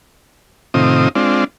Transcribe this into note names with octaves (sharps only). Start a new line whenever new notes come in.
A2 C3 D#3 C4 F4 D#6
G#3 C4 D4 F4